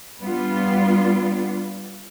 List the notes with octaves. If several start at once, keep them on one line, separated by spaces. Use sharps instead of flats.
G3 B3 D4 F4